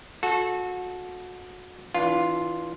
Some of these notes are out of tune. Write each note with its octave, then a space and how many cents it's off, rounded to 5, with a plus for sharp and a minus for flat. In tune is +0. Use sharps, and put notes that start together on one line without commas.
F#4 -25 A4 -20
E3 -20 D4 -40 F4 +0